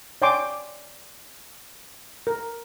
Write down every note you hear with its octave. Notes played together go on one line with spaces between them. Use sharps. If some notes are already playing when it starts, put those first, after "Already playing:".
C#5 D5 G5 G#5 C6 D6
A#4